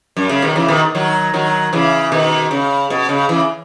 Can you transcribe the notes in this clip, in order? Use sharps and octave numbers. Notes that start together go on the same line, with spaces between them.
F#2
C#3
B2 D#3
C#3 E3
B2 D#3
D#3 F#3
D#3 F#3
C#3 E3
B2 D#3
C#3
B2
C#3
C#3 E3